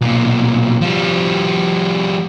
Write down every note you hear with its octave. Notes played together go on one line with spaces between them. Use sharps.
B1 A#2
F3 G3